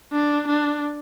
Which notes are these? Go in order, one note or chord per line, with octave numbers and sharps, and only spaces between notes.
D4
D4